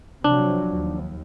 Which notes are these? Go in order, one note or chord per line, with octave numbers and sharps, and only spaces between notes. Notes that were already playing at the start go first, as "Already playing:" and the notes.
C3 F3 F#3 D4
D#2